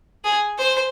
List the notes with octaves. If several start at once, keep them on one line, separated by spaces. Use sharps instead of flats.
G#4
C5